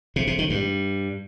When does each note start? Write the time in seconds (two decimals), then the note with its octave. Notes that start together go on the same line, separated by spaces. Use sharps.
0.16 C3
0.27 C3
0.39 D#3
0.50 G2